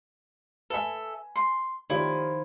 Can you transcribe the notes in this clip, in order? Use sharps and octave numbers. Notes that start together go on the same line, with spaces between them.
A4 B4 E5 G#5
C6
D#3 F3 E4 G4 C#5 D5